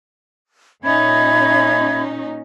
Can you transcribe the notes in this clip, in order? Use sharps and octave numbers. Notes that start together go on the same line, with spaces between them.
A#2 C#4 D#4 E5 B5 G#6